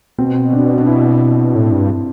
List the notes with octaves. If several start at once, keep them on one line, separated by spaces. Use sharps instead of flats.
B2 C4
D4
D4
E4
A2
G2